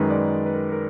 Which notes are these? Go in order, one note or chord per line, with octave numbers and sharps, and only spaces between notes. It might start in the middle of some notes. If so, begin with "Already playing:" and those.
Already playing: F#2 D#3 G#3 B4
D5
B4
B4
A#4
A#4